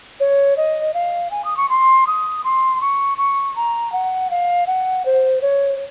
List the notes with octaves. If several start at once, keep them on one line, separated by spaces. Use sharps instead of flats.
C#5
D#5
F5
G#5
D#6
C#6
C6
D#6
C6
C#6
C#6
A#5
F#5
F5
F#5
C5
C#5